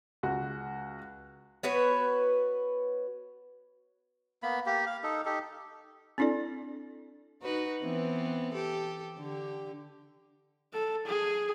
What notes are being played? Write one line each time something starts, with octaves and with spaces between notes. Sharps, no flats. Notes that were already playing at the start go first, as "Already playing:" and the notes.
C#2 F#4
B3 F#4 B4 C#5
A#3 B3 B5
A#3 G4
F5
D#4 A4
D#4 G4 A4
C4 D4 E4 A4 D5
D#4 F#4 B4
E3 B3 C4
G4 A4
D3 G4
A4
G#4